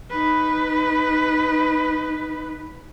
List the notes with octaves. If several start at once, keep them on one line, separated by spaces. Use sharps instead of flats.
D#4 B4